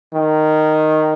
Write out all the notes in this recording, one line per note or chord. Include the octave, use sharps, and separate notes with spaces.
D#3